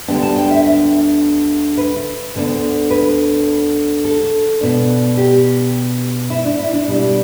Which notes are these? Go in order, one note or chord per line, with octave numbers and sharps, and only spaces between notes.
D2 D3 G3 B3 D4 G5
A5
G5
E5
E5
B4
D2 D3 B3 D4
B4
A4
B2 B3 D4
G4
E4
D4
E4
D4
B2 G3 D4